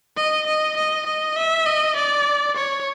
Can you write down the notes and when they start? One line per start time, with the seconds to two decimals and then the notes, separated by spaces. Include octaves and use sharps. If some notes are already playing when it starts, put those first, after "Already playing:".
0.17 D#5
0.47 D#5
0.77 D#5
1.06 D#5
1.36 E5
1.66 D#5
1.96 D5
2.57 C#5